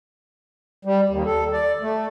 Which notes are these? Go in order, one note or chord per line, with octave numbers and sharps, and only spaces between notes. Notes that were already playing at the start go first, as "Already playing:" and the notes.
G3
D#2
A4
D5
A3